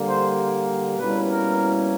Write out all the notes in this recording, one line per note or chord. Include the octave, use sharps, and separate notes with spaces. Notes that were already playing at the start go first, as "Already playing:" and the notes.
Already playing: D3 G3 A#3
C5
B2 G3 A#3 C#4 E4 B4
A#4